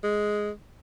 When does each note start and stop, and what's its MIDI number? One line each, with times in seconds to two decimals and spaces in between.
0.04 0.51 56